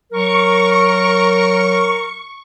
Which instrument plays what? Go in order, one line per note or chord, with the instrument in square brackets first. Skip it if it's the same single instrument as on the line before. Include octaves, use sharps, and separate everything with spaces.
[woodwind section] F#3 A#4 [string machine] C#6